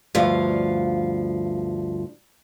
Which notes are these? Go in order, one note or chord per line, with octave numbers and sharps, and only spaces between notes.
D2 G2 F3 F5